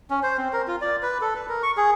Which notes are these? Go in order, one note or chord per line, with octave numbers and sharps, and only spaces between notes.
C#4
C5
C4
A#4
F4
D5
B4
A4
B4
A#4
C#6
G#4